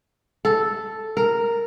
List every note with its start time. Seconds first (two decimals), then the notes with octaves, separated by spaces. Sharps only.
0.45 A4
1.17 A#4